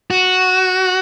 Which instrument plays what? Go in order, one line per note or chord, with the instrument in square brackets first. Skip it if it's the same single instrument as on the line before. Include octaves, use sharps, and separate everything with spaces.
[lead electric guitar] F#4